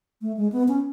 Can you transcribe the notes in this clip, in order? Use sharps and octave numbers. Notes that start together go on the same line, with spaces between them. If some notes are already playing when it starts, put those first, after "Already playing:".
A3
G#3
B3
C#4